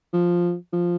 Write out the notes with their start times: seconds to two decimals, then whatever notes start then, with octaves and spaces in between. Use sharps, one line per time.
0.13 F3
0.72 F3